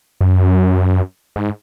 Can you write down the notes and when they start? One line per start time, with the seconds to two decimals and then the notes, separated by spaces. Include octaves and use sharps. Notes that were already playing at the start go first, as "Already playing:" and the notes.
0.21 F#2
1.36 G#2